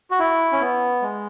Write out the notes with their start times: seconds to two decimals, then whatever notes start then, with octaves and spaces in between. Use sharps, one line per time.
0.11 F#4
0.19 E4
0.52 C#4
0.61 B3
1.02 G#3